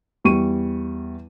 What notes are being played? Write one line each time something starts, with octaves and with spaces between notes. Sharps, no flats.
E2 G3 C#6 D#7